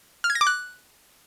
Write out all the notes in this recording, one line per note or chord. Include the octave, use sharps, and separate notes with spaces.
F6
G#6
A#6
D6
F#6